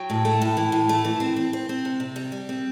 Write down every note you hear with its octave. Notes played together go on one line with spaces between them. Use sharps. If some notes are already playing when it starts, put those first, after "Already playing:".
Already playing: F#3 G5
A2
A3
A2
E3
A2
A3
E3
C4
C4
C4
C4
C3
C3
G3
G3
C4